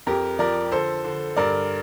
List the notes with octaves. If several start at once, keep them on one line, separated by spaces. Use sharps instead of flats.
F2 G4 A#4
F3 A#4 D5
D3 A4 C5
D3
G2 A#4 D5